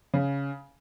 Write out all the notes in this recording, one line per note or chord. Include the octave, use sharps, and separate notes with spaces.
C#3